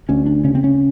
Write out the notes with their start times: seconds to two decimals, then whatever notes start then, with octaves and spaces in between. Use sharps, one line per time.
0.09 D2 C#4
0.26 D4
0.44 C#3 C#4
0.55 C4
0.64 C#4